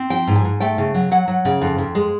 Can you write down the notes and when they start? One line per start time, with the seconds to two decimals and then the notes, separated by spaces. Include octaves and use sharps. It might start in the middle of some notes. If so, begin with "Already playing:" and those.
Already playing: C4
0.10 F3 G5
0.27 G#2
0.35 G#5
0.45 G#2
0.60 A3 G5
0.78 C#3
0.94 F#3
1.11 F#3 F#5
1.28 F#3
1.45 C#3
1.61 F2
1.78 F2
1.95 G#3